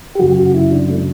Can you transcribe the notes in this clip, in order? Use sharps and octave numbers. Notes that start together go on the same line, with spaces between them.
G4
F#2 C#3 F#3 F#4
F#4
E4
D4
A3